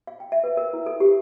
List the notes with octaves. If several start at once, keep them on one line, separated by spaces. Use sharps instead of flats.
F5
G5
E5
B4
A#4
E4
A4
G4